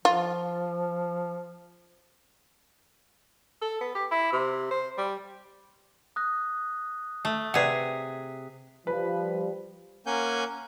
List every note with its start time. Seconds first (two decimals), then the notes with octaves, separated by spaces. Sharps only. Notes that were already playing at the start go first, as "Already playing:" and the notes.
0.05 F3 F4
3.62 A4
3.81 B3
3.95 G4
4.11 E4
4.33 C3
4.71 C5
4.98 G3
6.16 D#6 F#6 A#6
7.25 A3
7.54 C3 G#4 B4 D5 F#5 B6
8.87 F3 G3 B4
10.06 A#3 C#4 F#5 G#5 G6